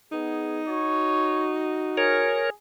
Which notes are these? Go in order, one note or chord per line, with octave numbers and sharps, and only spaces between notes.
B3 D#4 G#4
F#4 C#5
G#4 A#4 C#5